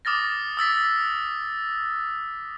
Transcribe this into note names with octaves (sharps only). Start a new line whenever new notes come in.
D6 D#6 F6 A6 A#6
D#6 E6 A6 B6